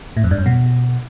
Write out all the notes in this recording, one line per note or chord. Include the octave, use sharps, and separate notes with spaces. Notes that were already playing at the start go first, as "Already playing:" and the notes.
A2
F2
G2
F#2
B2